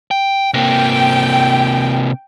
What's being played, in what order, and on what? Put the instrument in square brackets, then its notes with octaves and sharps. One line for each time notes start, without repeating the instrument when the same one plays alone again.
[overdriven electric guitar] G5
[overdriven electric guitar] C3 A#3 [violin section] G5